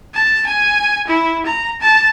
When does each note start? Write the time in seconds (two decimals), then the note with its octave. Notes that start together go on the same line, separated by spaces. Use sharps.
0.14 A5
0.46 G#5
1.07 E4
1.46 A#5
1.81 A5